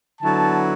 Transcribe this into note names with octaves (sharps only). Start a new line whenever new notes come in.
D3 F#3 B3 E4 A5